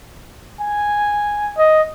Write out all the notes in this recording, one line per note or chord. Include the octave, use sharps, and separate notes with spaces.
G#5
D#5